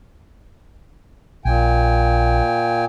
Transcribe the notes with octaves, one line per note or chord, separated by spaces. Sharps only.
A#1 A#2 G5 G#5